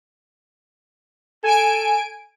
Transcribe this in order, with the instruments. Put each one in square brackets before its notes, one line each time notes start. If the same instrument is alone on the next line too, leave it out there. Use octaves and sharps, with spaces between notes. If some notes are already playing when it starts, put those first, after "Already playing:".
[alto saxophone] A4 [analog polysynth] G#5 D7